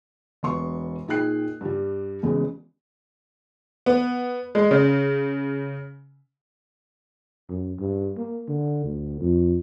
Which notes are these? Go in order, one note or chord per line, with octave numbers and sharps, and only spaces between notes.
E1 B3 C6 C#6
A#2 D#4 G#4 G5 F#6 C7
G2 G3
E1 E2 C#3 G#3
B3
G#3
C#3
F#2
G2
A#3
D3
D2
F2